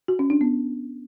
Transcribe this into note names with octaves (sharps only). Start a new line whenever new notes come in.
F#4
C#4
D4
B3